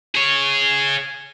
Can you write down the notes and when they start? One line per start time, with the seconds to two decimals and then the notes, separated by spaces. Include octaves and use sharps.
0.15 G#4 C#5